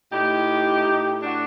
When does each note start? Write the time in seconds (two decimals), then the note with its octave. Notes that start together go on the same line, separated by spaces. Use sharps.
0.12 A2 D#4 G4
0.86 A2
1.23 D4 F#4